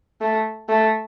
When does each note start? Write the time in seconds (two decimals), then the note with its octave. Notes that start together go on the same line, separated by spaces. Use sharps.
0.21 A3
0.69 A3